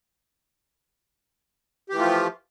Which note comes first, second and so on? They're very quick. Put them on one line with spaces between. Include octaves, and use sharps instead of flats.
G4 E3 A3 F4 F3